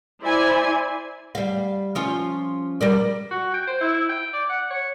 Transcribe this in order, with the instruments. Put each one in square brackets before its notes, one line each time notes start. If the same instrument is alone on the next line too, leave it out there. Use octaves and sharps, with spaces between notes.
[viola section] E4 C5 D5 E5 G#5
[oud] G3 F5
F3 C#4 F4
G3 A#4 D5
[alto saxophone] F#4
G5
C5
E4
G5
D5
F#5
C#5